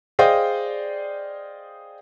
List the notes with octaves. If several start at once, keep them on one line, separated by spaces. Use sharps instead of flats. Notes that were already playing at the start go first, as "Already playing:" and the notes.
G#4 C5 D5 D#5 F5 G5